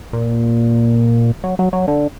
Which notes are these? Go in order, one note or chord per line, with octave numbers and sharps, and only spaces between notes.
A#2
F#3
F#3
F#3
D3